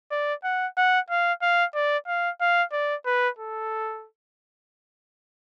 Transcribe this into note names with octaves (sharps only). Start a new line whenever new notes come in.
D5
F#5
F#5
F5
F5
D5
F5
F5
D5
B4
A4